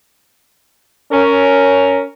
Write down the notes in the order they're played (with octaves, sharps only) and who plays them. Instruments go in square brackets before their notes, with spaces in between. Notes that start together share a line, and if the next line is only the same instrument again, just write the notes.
[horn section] C#4 A#4